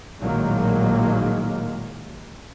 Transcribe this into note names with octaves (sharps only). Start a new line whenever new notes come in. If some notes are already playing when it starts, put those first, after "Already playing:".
A#1 A2 D#3 F#3 G#3 A#3